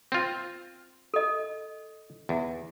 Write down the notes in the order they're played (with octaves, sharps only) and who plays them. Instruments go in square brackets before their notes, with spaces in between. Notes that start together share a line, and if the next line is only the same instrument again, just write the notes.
[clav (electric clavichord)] C4 F4
[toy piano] A4 D#5
[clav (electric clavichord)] E2